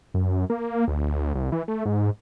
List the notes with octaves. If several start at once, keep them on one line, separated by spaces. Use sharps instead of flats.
F#2
A#3
D2
C2
E3
A3
G#2